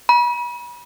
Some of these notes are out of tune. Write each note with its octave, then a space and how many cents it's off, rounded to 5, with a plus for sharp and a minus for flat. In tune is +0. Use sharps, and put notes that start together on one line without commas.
B5 -35